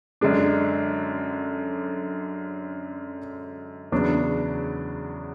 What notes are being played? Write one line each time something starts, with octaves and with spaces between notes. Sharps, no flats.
F#2 D3 G#3 D4
E2 C#3 F#3 B3 D4